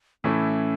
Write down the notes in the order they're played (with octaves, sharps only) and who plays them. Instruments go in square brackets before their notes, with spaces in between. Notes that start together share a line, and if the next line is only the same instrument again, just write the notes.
[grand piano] A2 E3 A3 E4 [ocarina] C#4